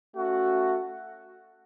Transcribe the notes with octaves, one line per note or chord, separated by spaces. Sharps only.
A3 C#4 F#4